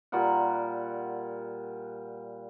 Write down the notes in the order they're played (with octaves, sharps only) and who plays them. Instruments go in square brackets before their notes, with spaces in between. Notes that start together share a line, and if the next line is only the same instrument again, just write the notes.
[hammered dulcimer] A#2 G3 A#4 F#5